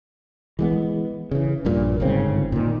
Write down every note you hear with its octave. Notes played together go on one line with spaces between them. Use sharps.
E3 G#3 B3
C#3 E3
A#1 G2 A#2
G1 G#2 C#3 C4
A#2 D#3